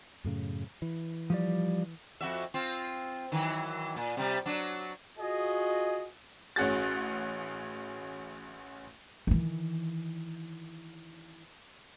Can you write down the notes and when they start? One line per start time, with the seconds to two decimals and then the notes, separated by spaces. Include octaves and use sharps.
0.24 F#2 A2 C#3
0.82 E3
1.30 F3 G3 D5
2.21 F2 F#4 E5
2.54 C4 F4
3.32 D#3 E3 F#3
3.96 A#2
4.17 C3 G3
4.46 F#3 D4
5.18 F4 F#4 G#4 D#5
6.56 A1 C#4 F#4 G#4 A6
9.27 D#3 E3